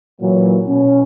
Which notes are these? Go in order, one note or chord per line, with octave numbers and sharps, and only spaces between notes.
A#2 E3 F#3
B2 C#4